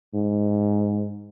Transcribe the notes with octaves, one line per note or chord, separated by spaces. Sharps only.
G#2